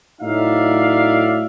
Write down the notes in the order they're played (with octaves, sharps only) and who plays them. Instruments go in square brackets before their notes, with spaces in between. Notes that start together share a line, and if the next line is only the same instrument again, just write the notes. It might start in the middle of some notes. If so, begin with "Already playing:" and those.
[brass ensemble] A2 F#3 D#4 D5 E5 F5